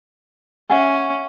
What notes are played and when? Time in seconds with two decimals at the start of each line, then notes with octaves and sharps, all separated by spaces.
0.70 C#4 E5 F#5 G#5